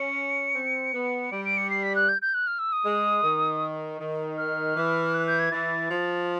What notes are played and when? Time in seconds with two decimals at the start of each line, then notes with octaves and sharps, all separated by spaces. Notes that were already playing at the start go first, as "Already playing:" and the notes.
Already playing: C#4 C#7
0.56 C4
0.94 B3
1.32 G3 D7
1.45 D7
1.57 C#7
1.70 C7
1.83 B6
1.96 F#6
2.09 G6
2.22 G6
2.34 F#6
2.47 F6
2.59 E6
2.72 D#6
2.86 G#3
3.24 D#3
4.00 D#3
4.38 F6
4.76 E3
5.14 F#6
5.27 G6
5.39 G#6
5.52 E3 A6
5.91 F3